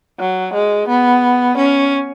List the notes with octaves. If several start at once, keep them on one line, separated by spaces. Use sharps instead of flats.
F#3
G#3
B3
C#4